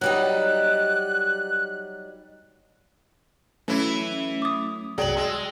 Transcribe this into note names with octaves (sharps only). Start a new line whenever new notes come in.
F#3 G3 D#4 F#6
E3 F#3 A3 C#4 E4
D6 D#6
C2 F#2 F#3 G#4 D5 G5 F#7
G#3 C6 E6 A6